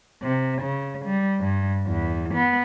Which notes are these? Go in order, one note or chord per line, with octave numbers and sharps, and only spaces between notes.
C3
C#3
G3
G2
E2
B3